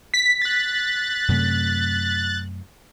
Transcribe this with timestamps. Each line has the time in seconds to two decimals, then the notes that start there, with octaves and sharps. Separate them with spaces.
0.14 B6
0.42 F#6 A6
1.28 F#2 C3 A3